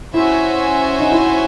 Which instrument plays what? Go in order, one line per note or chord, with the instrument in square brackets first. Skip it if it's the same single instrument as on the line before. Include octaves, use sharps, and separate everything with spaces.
[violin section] C#4 F#4 C5 E5 G#5 [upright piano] E4
[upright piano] D#4
E4